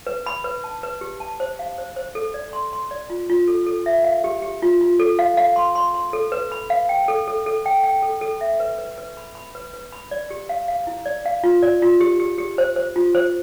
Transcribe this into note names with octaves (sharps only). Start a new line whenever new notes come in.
B4
B5
B4
A5
B4
G4
A5
C5
F5
C5
C5
A4
D5
C6
C6
D5
F4
F4
A4
A4
E5
F5
G4
G4
F4
F4
A4
F5
F5
C6
C6
C6
A4
B4
B5
F5
G5
A4
A4
A4
G5
G5
A4
A4
E5
B4
B4
B4
B5
B5
B4
B4
B5
D5
G4
F5
F5
E4
D5
F5
F4
D5
F4
G4
G4
G4
C5
C5
F4
C5